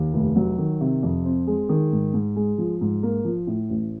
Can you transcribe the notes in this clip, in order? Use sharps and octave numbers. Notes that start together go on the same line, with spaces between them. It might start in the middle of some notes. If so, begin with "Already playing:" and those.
Already playing: D#2
F1
F#3
D#3
C3
F2
C4
G#3
D#3
G#2
G#2
G#3
F3
G#2
A#3
F3
A2
A1